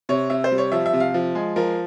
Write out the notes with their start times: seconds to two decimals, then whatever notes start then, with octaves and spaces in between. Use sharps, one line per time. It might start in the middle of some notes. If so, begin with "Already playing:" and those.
0.09 C3 C#5
0.30 C3 E5
0.44 C5
0.52 G3
0.58 C#5
0.72 F3 E5
0.86 E5
0.93 C3
1.00 F5
1.14 F3
1.35 G#3
1.56 F3 A#4